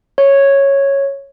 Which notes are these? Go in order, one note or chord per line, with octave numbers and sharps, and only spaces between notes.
C#5